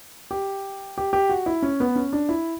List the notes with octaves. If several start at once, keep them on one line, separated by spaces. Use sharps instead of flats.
G4
G4
G4
F#4
E4
C#4
B3
C#4
D4
E4